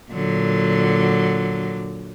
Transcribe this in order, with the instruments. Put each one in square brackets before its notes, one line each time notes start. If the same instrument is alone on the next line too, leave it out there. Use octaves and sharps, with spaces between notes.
[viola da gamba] A#2 D3 F#3